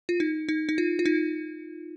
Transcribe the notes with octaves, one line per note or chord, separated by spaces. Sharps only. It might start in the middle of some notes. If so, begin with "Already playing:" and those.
F4
D#4
D#4
D#4
F4
F4
D#4